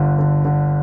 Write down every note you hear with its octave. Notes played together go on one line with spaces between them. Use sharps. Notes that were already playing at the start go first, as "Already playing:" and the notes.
Already playing: G1 D3
D3
D3